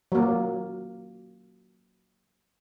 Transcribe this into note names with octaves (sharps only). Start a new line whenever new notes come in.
F#3 A#3